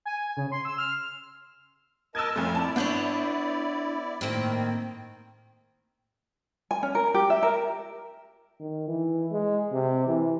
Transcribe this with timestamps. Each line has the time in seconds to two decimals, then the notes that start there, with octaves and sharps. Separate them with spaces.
0.05 G#5
0.37 C#3
0.52 C6
0.65 E6
0.78 F6
2.15 A#4 D#5 A5 E6 G#6
2.36 F2 A3 C#4 F4
2.55 E4 D5 A5
2.76 B3 D4 C5 C#5 G6 F#7
4.21 A2 D#3 A#3 C4
6.71 G#5
6.83 C#4
6.95 A#4
7.14 G4
7.30 E5
7.43 A#4
8.60 D#3
8.88 E3
9.32 G#3
9.72 C3
10.07 E3